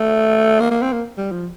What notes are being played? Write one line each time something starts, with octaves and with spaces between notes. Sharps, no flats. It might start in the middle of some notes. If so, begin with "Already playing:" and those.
Already playing: A3
A#3
A#3
C4
A#3
G3
F3